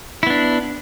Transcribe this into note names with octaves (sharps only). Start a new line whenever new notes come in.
B3 D4 E4